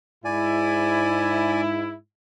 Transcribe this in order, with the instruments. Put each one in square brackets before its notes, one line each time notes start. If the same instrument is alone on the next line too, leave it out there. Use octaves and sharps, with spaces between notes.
[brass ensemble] G#2 E4 [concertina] D5 G#5